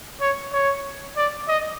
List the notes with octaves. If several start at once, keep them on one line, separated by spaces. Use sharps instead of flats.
C#5
C#5
D5
D#5